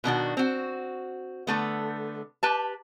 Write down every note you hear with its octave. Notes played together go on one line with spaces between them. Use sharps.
B2 D#3 D4 F#4
C4 F#4
D3 A3 B3
G4 B4 A5